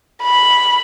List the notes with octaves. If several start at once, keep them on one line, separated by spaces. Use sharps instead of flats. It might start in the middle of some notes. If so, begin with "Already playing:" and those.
B5